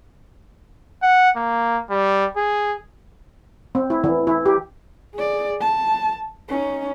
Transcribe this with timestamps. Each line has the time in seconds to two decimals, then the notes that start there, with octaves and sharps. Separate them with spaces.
1.02 F#5
1.37 A#3
1.90 G3
2.37 G#4
3.75 C4
3.90 E4
4.04 E3
4.27 E4
4.46 G4
5.15 G#4 D5
5.61 A5
6.49 C#4 D#4